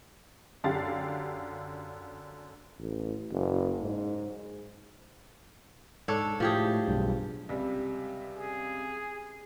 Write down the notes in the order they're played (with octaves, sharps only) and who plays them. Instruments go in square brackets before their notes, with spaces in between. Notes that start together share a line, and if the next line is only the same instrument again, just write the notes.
[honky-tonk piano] F#2 D3 G4 F5 F#5 A6
[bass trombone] A1
F#1
G#2
[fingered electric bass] G#2 [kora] D4 A4 C#5
[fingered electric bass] A2 [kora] F3 G4 G#4
[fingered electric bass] B1 G2
[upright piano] C#2 C3 G3
[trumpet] G#4